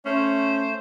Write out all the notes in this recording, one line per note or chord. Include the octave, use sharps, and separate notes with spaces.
A3 C#4 C5